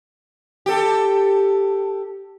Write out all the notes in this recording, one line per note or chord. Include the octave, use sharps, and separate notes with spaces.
G4 A4